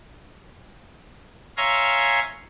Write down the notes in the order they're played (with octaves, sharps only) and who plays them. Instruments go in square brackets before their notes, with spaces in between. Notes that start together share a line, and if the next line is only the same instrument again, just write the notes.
[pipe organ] C#5 E5 F5 G#5 A#5 C6